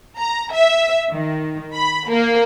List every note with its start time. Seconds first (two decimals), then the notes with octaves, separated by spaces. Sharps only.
0.18 A#5
0.53 E5
1.11 D#3
1.74 B5
2.09 A#3